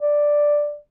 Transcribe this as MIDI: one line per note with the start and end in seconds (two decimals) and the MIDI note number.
0.01 0.76 74